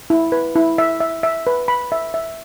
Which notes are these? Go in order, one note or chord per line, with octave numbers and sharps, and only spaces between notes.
E4
B4
E4
E5
E5
E5
B4
B5
E5
E5